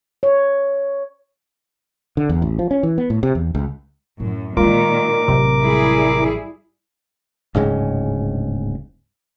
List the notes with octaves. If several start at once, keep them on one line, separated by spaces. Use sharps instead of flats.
C#5
D3
E2
A1
F3
C#4
E3
B3
A2
C3
E2
C#2
F#2 A2
A#2 D#3 G#3 A#3 F4 A#4 D6
A1 C3 F#3
G3 E4 G#4
D1 G#2 C#3 G#3